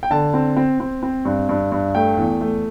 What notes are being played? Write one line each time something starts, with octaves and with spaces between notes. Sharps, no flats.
G5
D3 A5
C4
C4
C4
C4
G2
G2
G2
A3 G5
E2
A3